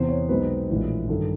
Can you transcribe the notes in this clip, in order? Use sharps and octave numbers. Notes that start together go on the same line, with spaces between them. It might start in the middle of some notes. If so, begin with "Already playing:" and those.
Already playing: E2 C3 E3 C5
C#5
B1 B2 G#3 C4 D#4 B4
A#1 A2 E3 G#3
G2 D#3 A4